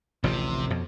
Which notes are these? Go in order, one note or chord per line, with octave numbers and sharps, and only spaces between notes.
A1 D2 C3 F3
F2 B2